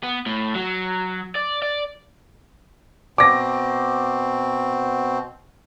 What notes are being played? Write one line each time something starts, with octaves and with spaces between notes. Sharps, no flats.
B3
A2
F#3
D5
D5
B2 C4 D6 A#6